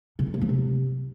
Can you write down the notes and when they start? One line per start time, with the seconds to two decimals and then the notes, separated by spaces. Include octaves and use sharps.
0.19 C#3
0.26 D#3
0.34 A#3
0.41 F3
0.49 C3